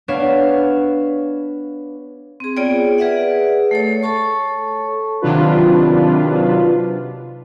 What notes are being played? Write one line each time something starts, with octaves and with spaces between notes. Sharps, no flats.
B3 D4 C#5 F5 E7
C4 G#4
B3 F4 G#4 C#5 D5 G5
G#4 B4 D5 E5 F#5
A3 A4 C#5
A4 C#5 A5 C#6
C3 D#3 F#3 D4 F4 B4